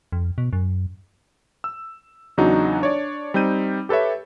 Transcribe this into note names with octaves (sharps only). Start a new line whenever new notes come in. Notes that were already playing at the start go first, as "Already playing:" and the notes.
F2
B2
F#2
E6
E2 C#3 F#3 D4 D#4 F#4
D4 C#5 D5
G3 C4 D#4 G6 D#7
G4 A4 B4 C#5 E5